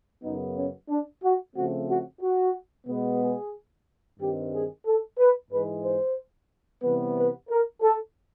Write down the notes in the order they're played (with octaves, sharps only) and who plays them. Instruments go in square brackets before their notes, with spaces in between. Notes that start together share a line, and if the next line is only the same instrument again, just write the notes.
[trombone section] F#2 C#3 F#3 B3 D#4
C#4
D4
F#4
C#3 F3 A3 C4 F#4
F#4
F#4
B2 G#3 B3
G#4
G2 D#3 G3 C4 G4
G#4
A4
B4
G#2 E3 G#3 B4
C5
C3 E3 G3 B3 B4
B4
A#4
A4